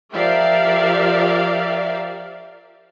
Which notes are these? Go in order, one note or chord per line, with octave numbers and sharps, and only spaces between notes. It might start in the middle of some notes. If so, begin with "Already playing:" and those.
F3 G4 A#4 D5 E5 F5